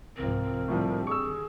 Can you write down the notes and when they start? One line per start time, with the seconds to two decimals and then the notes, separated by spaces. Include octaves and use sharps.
0.17 C2 G#2 F3 C4 A#4
0.68 A2 D3 D#3 F3 G3
1.07 G#4 C#6 E6